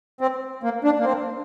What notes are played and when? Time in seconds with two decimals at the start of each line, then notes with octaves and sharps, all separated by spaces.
0.21 C4
0.63 A#3
0.84 D4
1.00 A#3
1.05 C4